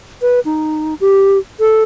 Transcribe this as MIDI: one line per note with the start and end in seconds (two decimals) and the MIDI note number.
0.22 0.40 71
0.45 0.95 63
1.00 1.38 67
1.60 1.83 69